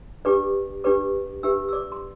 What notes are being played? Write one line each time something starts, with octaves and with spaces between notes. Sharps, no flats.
D4 G4 B4 D5 D6
D4 G4 B4 D5 D6
D4 G4 B4 E5 E6
E6
D5 D6
C6